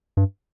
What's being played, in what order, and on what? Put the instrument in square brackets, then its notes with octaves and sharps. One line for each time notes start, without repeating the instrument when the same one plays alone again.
[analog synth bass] G2